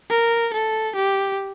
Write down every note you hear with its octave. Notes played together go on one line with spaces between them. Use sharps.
A#4
A4
G4